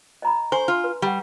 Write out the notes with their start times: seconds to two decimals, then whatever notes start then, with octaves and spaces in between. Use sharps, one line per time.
0.22 D#5 A#5 B5
0.52 C5 G#5 C6
0.68 F4
0.84 B4
1.02 G3 G4 F#5